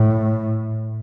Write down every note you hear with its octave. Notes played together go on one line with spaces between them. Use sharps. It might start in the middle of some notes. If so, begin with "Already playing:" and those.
Already playing: A2